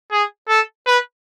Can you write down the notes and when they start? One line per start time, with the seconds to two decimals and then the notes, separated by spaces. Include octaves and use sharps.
0.12 G#4
0.49 A4
0.87 B4